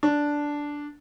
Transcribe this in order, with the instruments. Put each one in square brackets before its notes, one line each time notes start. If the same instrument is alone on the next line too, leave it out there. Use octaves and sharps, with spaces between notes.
[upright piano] D4